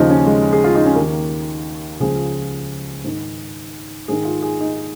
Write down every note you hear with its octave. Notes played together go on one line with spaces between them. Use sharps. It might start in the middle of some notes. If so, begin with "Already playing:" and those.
Already playing: D#2 C#3 F3 D#4
C#4
G#3
G#4
F4
D#4
C#4
D#2 D#3 A#3
C#2 C#3 F3 G#4
G#2 D#3
G#2 D#3 G#4
F4
G#4
D#4